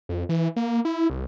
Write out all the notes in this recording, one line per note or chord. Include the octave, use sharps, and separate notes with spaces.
F2
E3
A#3
E4
C2